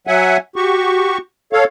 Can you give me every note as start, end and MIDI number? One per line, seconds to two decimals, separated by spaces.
0.07 0.37 54
0.07 0.37 76
0.07 0.37 78
0.07 0.37 80
0.56 1.18 66
0.56 1.18 67
0.56 1.18 85
1.53 1.64 69
1.53 1.64 73
1.53 1.64 77